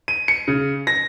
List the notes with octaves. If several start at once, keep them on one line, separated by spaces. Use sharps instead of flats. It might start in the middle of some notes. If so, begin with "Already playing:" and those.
D#7
C#7
C#3
A#6